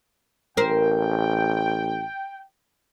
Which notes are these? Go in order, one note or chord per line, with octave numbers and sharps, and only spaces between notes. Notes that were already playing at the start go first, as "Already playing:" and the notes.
A1 A#4 C5 G5